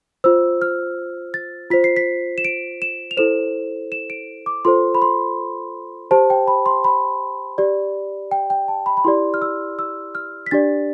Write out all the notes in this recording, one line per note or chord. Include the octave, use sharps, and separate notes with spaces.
F4 C5 E6
F6
A6
F4 C5 B6
C7
B6
E7
D7
E7
F7
E4 A4 C5 E7
E7
D7
D6
F4 A4 C5 C6
B5
C6
G4 C5 A5
G5
B5
C6
B5
G4 D5
G5
G5
A5
B5
B5
E4 G4 D5 C6
F6
E6
E6
F6
B6
D4 G4 D5 A6